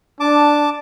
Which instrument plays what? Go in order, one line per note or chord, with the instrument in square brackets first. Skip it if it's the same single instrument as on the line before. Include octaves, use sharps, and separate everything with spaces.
[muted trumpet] D4 [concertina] A5 D6